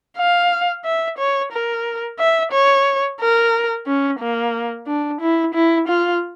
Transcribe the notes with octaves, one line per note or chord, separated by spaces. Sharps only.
F5
E5
C#5
A#4
E5
C#5
A#4
C#4
A#3
D4
E4
E4
F4